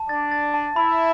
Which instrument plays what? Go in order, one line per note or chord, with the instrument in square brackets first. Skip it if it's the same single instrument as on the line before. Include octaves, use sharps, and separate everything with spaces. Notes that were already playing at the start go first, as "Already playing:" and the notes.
Already playing: [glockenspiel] A5
[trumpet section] D4 D5 [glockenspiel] A6
[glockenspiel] A6
A5
[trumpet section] E4 E5 [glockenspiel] B5